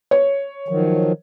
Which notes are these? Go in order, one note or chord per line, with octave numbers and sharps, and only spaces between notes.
C#5
D#3 F3 F#3